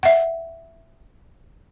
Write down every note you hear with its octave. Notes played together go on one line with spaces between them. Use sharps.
E5 F#5